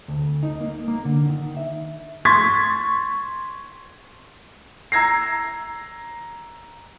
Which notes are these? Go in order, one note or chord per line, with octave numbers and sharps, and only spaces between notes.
D2
D#4
A#3
A#3
D3
D#3
E5
C6 C#6 G#6 A6 B6
A#5 E6 G#6 A#6 C7